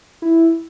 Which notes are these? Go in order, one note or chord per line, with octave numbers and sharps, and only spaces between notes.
E4